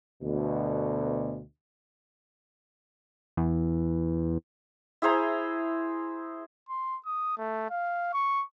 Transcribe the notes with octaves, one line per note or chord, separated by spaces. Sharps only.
D2 B2
E2
E4 G#4 C5 A#5
C6
D#6
A3
F5
C#6